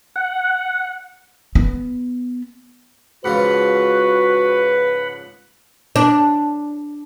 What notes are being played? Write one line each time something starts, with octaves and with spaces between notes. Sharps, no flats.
F#5
B3
G#2 C#3 F3 F#4 B4 F#5 B5
D4